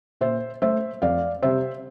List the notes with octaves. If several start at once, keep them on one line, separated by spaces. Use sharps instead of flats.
A#2 C5 E5
A3 C5 E5
F2 D5 F5
C3 G3 C5 E5